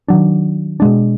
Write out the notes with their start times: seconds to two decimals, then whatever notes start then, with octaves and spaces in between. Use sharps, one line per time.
0.08 D#3 F#3 D4
0.80 B2 G#3 D4